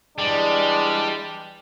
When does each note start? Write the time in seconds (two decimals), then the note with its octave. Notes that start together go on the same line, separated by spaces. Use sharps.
0.18 E3 G3 G#3 D4